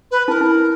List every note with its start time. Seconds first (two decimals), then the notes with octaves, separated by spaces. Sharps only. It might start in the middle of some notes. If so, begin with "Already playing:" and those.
0.11 B4
0.28 E4 A#4
0.41 E4